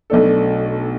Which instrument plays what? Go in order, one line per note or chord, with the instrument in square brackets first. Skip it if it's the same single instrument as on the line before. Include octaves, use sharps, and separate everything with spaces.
[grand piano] B1 B2 A3 D4 A4